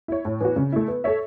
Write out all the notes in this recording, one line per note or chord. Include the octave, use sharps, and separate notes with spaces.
E4 C#5
A2
E3 B3 F#4
C#3
A3 E4
B3
A4 C#5 E5